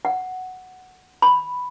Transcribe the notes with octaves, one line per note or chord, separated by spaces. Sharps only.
F#5
B5